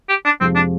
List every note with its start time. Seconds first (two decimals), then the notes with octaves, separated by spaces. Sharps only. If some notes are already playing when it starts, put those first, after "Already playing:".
0.09 G4
0.25 D4
0.41 F2 C3 F3 G#3 C4
0.56 D4